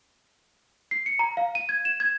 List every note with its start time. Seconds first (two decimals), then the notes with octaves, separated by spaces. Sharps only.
0.91 C7
1.06 C#7
1.19 A#5
1.37 F5
1.55 D#7
1.69 G#6
1.85 E7
2.00 G#6